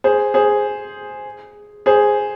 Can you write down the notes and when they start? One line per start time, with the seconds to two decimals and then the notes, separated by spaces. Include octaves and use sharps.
0.04 G#4 C5
0.34 G#4 C5
1.86 G#4 C5